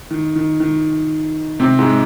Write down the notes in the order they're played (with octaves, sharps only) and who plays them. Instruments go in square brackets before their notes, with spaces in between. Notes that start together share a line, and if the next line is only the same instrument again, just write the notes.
[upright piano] D#3
D#3
D#3
C3 C4
G#2 G#3